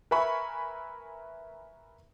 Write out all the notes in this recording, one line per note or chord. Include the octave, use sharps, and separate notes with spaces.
A#4 B4 E5 G#5 B5 C#6